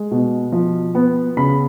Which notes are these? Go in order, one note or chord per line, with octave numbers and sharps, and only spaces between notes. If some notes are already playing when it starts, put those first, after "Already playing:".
Already playing: G#3
B2
F3
B3
C#3 B5